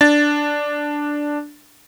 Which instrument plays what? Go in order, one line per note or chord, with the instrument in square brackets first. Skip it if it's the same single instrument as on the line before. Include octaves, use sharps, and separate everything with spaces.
[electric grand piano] D4 A6